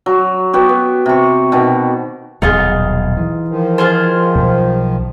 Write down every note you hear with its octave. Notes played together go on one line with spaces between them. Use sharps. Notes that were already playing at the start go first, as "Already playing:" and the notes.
F#3
B3 F#4 G4
B3
C3 C#6
B2 D#3 B3
D#1 B1 B2 D#4 F4 G#4
E3
D#3 F3
F4 G#4 C5
B1